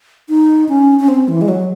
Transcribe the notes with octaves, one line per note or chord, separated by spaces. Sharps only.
D#4
C#4
C#4
C4
E3
G#3
F#3